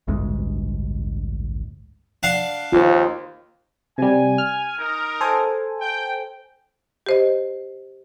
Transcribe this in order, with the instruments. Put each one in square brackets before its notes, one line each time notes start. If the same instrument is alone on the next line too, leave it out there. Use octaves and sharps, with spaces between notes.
[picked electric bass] A1 D2 G2 G#3
[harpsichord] D4 F5 F#5
[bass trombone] D#2 [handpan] F4 C5
[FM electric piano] C3 G3 [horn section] G#5
[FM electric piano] F6
[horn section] D#4 A#4
[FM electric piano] A4 C5 G#5
[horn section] G5
[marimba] G4 C5 D#5